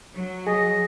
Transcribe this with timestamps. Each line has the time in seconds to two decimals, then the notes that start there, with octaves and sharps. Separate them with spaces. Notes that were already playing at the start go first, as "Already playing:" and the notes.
0.14 F#3
0.47 G#4 D#5